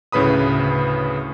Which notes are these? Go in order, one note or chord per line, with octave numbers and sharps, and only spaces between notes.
D2 A2 C#3 B4 B5 D#6